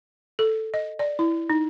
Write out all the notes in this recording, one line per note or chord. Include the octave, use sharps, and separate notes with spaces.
A4
D#5
D5
E4
D#4